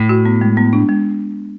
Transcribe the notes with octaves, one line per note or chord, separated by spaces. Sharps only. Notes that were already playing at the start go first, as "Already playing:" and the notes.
Already playing: A2
F#4
B3
G#3
B3
D4
G#3